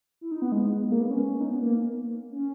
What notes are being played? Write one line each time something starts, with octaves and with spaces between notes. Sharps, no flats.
E4
D#4
B3
G#3
G#3
A#3
B3
C#4
D#4
B3
A#3
C#4